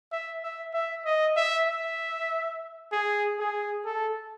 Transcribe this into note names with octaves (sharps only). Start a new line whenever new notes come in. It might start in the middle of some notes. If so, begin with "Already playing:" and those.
E5
E5
E5
D#5
E5
E5
G#4
G#4
A4